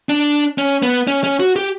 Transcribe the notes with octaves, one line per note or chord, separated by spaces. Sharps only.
D4
C#4
B3
C#4
C#4
F#4
G4